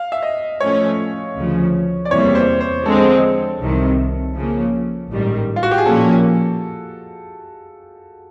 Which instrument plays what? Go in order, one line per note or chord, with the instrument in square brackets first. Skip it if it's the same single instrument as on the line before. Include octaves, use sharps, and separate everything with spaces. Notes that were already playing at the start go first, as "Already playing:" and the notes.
Already playing: [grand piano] F5
E5
D#5
[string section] A2 F3 A3 C#4 [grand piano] C#5
[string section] D2 C#3 F3
[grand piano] D5
[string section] E2 C3 E3 G3 A#3 [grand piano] C#5
[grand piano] C5
C5
[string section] D3 F3 G#3 C4 [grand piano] A4
[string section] C2 C3 D#3
C#3 F3 A#3
A1 G#2 D#3 G3
[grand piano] F4
F#4
G4
G#4
[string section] A#2 F3 A#3 C#4 [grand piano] A4